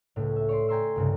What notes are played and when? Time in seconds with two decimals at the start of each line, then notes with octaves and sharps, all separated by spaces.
0.16 C#2 A2
0.36 E5
0.49 C#5 D5 C6
0.68 G5 G#5 A#5 C6 E6
0.96 C2 G2 C#3